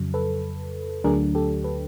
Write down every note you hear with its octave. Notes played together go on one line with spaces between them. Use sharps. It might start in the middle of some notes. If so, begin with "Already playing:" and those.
Already playing: F2 C#3 F#3
A4 B4
D2 D3 F#3 A3 D4 G#4 A#4
G4 A4
A4 B4